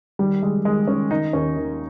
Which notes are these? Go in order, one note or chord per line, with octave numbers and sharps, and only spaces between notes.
D#3 G3
D#3 G#3
D#3 G#3
D#3 C#4
D#3 D#4
D#2 C#4
D#3